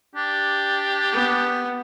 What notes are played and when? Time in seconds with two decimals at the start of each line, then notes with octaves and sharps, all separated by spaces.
0.16 D4 G4
1.12 B3